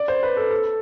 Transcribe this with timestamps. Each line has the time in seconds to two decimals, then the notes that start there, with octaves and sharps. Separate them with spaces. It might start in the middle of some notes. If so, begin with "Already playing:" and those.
Already playing: D5
0.08 C5
0.23 B4
0.37 A4
0.51 A4